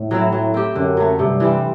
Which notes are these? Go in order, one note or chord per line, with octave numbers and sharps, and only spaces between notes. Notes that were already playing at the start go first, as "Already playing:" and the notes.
Already playing: A2
F#3 C4 E4
F#3
C4 G4
F#2 D3
F#3 A3
G2 C3
E3 G3 C4